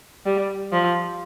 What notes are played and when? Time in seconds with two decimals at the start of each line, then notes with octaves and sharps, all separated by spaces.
0.26 G3
0.73 F3